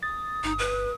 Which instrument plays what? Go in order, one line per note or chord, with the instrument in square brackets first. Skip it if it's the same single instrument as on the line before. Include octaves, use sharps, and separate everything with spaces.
[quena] D#6 [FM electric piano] A6
[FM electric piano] G1 [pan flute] D#4
[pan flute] B4